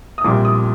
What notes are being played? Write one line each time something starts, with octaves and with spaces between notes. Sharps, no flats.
D#6
A#1 A#2 G3 C4 D6
D#6